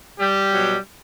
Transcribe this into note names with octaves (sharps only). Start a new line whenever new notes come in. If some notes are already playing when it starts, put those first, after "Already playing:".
G3 G4
B2 F#3